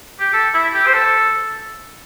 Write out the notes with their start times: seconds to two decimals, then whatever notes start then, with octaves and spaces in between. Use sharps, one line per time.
0.19 G4
0.33 A4
0.54 E4
0.74 G4
0.87 C5
0.94 A4